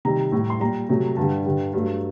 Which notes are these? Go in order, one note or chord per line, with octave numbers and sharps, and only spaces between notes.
C3 D#3 G3 A#5
A2 G3
C6
A#2 G3 A#5
C3 F#3 A3
G2 D3 G3 A5
G2 D3 G3
G2 F#3 A3